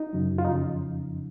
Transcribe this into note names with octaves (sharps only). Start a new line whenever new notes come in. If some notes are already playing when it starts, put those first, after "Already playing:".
Already playing: D#4
F#2 C#3 F#3
F4
F2 C#3 F3 D#4